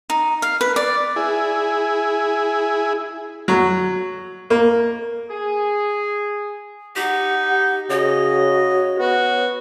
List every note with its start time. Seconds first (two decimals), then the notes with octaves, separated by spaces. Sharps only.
0.10 D#4
0.42 F5
0.61 B4
0.76 D5
1.16 E4 G#4
3.48 F#3
4.50 A#3
5.30 G#4
6.96 D#4 G4 F#5
7.90 C#3 F#4 C#5 D#5
8.99 B3 F#4 B4